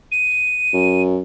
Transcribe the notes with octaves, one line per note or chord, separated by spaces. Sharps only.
D#7
F#2